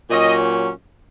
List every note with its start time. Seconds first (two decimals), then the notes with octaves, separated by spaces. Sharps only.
0.10 A#2 F#3 C#4 D#5